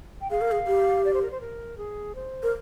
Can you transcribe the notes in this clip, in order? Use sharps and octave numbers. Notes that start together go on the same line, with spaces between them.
G5
G#4 F5
A#4
G#4
G4
D5
C5
A#4
C5
A#4
G#4
C5
A#4